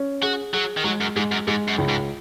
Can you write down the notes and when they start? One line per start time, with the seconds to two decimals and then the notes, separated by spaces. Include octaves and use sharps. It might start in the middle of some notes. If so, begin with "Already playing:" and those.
Already playing: C#4
0.23 F#4 G#4
0.53 F#3 G#4
0.77 D#3
0.84 F#3 G#3
1.01 F#2
1.16 G#2 G#3
1.32 F#2
1.47 G#2 G#3
1.68 F#2
1.78 C#2
1.88 G#2